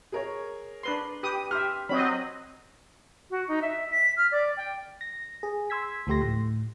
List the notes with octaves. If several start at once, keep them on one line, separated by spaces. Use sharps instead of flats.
G#4 A#4 C#5
D4 B4 C6
G4 B4 D#6
G4 E5 C6 F6
F#3 C4 D#5 B5
F#4
D#4
E5
B6
F6
D5
G5
A#6
G#4
C6 E6 G#6 B6
D2 F3 A3 G4 C6 A#6
A2